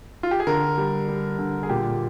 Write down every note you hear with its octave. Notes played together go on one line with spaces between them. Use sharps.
F4
G4
G#4
D3 A#4
G3
G3
D3
G#4
A#2 G4